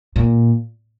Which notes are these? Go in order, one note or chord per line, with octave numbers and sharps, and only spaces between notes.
A#2